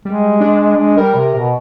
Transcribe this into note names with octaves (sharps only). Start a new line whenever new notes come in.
G3 G#3
D4
G#3
G3 A#4
C3
B2